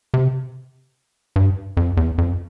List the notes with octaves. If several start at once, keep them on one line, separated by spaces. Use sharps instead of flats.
C3
G2
F2
E2
F2